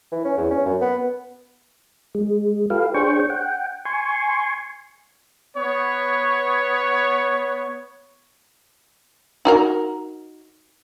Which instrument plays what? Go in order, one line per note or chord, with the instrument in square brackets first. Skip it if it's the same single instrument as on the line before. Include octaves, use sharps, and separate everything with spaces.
[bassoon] E3
C#4
E2
C#4
F#2
B3
[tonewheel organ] G#3
F4 G4 A4 B4 F5
D4 G#4 C5 C#5 G5 C#6
F#5 G5
G#5 C6 C#6
[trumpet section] B3 C#5
[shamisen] D#4 F#4 A#4